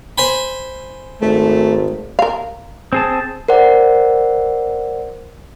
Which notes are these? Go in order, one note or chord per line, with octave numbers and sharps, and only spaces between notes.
C5 G#5 B5
G#1 A3
A#4 F5
C4 G#4 A5
A#4 C5 D5 F#5